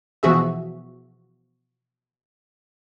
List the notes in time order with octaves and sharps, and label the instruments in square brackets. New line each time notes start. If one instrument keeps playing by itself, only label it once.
[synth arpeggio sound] B2 E3 F3 F#4 G#4 E5